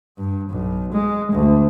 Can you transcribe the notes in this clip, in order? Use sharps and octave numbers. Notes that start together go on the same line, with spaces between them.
G2
B1
G#3
D2